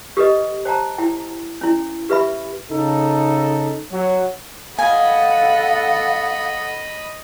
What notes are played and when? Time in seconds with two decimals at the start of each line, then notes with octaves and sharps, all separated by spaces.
0.17 G4 A4 B4 D#5
0.65 C5 G5 A5 A#5
0.98 E4 G5
1.61 C#4 E4
2.09 G4 B4 E5 B5
2.71 C#3 D#4 A4
3.92 F#3
4.79 A4 D#5 F5 F#5 G#5 B5